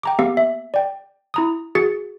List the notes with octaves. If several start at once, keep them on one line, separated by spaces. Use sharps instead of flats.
G5 A#5 D6
A#3 B3 G4 F5 D6
E5
D5 G5
E4 A#5 D#6
F#4 G#4 A6 C#7